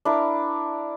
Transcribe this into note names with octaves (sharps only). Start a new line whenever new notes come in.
D4 E4 A#4